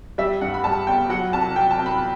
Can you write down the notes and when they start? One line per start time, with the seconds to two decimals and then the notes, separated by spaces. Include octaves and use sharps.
0.18 G3 E5
0.41 G2 F#5
0.54 B5
0.64 G3 A5
0.87 G1 G5
1.09 F#3 F#5
1.33 C2 A5
1.56 F#3 G5
1.71 A5
1.79 C2
1.86 B5